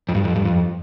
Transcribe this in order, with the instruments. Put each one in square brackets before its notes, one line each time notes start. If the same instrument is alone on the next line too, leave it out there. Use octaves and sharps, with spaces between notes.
[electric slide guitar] F2
G2
F2
G2
F2